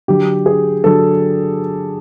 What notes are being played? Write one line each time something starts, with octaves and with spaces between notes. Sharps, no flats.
D3 F#3 G4
G#4
D3 F#3 A4